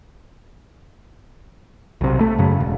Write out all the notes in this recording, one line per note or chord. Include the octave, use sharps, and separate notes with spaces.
B1 C3
A3
F#2 C#3
E1